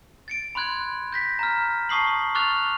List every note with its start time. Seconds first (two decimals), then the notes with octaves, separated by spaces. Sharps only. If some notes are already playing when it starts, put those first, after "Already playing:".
0.28 A6 C#7 D7
0.55 B5 C6 F#6 G#6
1.12 G6 A#6 B6
1.39 A#5 F6
1.89 A5 C#6 D#6 C7 F#7
2.35 C#6 D6 F6 F#6 A6 F7